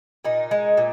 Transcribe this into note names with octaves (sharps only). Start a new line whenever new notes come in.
A#2 D#4
G#3
A#2